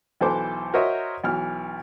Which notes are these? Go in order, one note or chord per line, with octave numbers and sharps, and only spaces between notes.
B1 E3 A4 C5 D6
F#4 A#4 C5 C#5 D#5 E5
B1 E3 F6